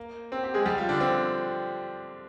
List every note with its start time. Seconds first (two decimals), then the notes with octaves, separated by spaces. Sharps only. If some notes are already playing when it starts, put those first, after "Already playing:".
Already playing: A#3
0.32 C4
0.44 G4
0.54 G#3 G#4
0.66 G3 G4
0.78 F3 F4
0.89 D3 D4
1.00 C4